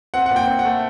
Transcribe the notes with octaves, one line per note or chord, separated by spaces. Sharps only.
C4 F#5
F#5
A#2
G5
C4
F#5
A3